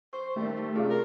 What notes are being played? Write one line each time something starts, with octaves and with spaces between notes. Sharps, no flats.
C5 C#6
D#3 G3 A3 A#3 G4
C3 D4 F4 G#4 F5
A#4